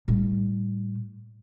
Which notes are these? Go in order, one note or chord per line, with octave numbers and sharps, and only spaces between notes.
A2 G3